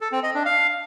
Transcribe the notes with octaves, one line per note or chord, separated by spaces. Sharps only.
A4
C4
D#5
D4
F5